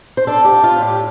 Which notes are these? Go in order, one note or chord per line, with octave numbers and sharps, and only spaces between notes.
C5
D4 A4
G4
F4
F4
A2
G4